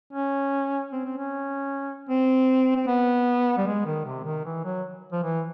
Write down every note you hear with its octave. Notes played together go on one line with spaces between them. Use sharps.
C#4
C4
C4
C#4
C4
C4
B3
G3
G#3
D#3
C3
D#3
E3
F#3
F3
E3